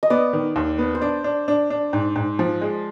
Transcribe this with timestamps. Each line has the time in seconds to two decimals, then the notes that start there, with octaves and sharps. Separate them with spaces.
0.03 D#5
0.10 B3 D5
0.33 D#3
0.56 D#2
0.79 B3
0.95 C5
1.02 D4 D5
1.24 D4
1.48 D4
1.70 D4
1.93 G#2
2.16 G#2
2.39 F3
2.62 G#3